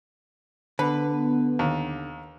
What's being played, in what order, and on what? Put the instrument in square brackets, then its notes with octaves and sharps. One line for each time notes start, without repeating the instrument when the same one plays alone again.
[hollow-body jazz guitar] D3 [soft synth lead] B3 [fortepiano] B4
[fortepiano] D#2